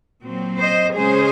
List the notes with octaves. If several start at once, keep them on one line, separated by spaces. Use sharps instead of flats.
A#2 F#3 C4
C5 D#5
C#3 G#3 C#4 G#4 C5